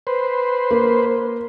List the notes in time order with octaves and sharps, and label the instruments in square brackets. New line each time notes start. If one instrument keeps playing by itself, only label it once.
[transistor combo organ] B4 C5
[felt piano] A#3